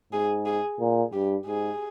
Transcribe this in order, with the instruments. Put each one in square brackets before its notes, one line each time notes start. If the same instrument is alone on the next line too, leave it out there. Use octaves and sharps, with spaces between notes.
[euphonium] G#2 [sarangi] G#4
[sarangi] G#4
[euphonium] A#2
[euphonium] G2 [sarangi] G4
[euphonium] G#2 [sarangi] G#4